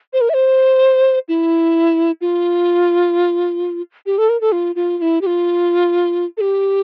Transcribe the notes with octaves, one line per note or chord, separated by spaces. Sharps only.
C5
A#4
E5
C5
E4
F4
G4
A4
A#4
A4
F4
F4
F4
E4
G4
F4
A4
G4